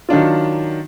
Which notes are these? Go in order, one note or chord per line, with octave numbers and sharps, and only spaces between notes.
D#3 F#3 D4 F4